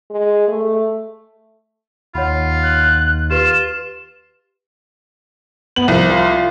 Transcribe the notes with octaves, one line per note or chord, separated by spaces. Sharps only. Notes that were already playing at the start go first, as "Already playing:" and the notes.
G#3
A3
D#2 F4 C#5 F#5 B5
F#6
F4 G4 B4 E7
B3 F#7
C2 F3
F4